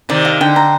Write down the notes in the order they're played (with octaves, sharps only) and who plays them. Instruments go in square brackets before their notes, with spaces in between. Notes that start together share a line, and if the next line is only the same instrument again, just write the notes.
[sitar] C3 D#3 [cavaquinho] D5
[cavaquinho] F5
[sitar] D3 [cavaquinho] G5
[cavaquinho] A#5